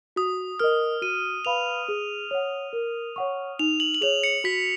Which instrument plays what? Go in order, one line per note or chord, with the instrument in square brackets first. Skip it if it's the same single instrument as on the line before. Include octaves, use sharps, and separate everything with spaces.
[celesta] F#4 [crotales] D#6
[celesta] A#4 D#5 [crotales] F6
[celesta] F#4 [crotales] D#7
[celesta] B4 F5 B5 [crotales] F7
[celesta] G#4
C#5 F#5
A#4
C#5 F#5 C#6
[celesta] D#4 [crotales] F7
[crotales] F#7
F#7
[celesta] G#4 C#5 [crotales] F7
[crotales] C#7
[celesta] F#4 [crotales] B6